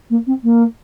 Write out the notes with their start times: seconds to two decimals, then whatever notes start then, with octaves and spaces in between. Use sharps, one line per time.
0.10 A#3
0.26 C4
0.43 A#3